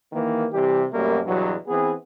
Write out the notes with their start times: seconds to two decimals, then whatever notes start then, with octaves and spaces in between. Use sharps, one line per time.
0.13 D#2 D#3 E3 A#3
0.52 C3 E3 G3 G4
0.92 F#2 B2 G3 A3 A#3
1.25 E2 G2 B2 F#3
1.68 E3 B3 C4 G#4